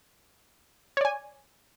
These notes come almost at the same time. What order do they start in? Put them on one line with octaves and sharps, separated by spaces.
C#5 D5 G#5